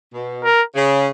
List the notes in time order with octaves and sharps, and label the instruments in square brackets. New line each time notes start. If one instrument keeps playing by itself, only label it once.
[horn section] B2
[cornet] A#4
[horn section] C#3